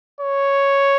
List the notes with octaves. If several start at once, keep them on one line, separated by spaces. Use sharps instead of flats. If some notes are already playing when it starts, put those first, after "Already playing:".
C#5